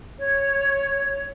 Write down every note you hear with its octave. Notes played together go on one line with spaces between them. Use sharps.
C#5